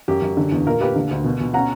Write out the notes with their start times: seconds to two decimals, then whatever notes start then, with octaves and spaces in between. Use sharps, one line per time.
0.08 F#2 G4
0.22 F#2
0.37 D3
0.52 E2
0.66 A#2 A#4
0.81 A#3 G4 B4
0.96 D3
1.11 D2
1.24 B2
1.40 B2
1.54 C#4 F#5 A#5